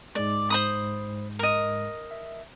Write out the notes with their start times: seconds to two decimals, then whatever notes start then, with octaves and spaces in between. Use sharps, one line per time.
0.15 G#2 G#3 D5
0.50 C5 B5 D#6
1.39 A#4 D#5
2.11 E5